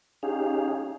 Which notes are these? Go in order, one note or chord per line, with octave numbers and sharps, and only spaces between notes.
C#4 D#4 G4 G#4 F5